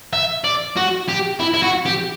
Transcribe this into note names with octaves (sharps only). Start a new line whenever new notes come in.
E5
D5
F#4
G4
E4
E4
F#4
G4